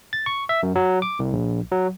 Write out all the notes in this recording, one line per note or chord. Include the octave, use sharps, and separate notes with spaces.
A6
C#6
E5
F#2
F#3
D6
C2
A#1
F#3